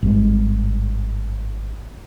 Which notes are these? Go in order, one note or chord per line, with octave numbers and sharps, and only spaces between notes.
G#1 G2 G#3